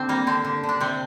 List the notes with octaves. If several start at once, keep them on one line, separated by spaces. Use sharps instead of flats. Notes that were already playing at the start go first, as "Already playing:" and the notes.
Already playing: D3 C4 D4
G3 A#3
D3 C4
D3
D3
D4
C3 C4